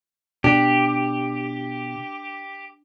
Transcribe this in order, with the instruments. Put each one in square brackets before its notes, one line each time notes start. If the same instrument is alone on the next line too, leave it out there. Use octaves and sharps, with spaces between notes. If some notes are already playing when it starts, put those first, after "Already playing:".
[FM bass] B2 [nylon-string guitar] D4 [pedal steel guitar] G4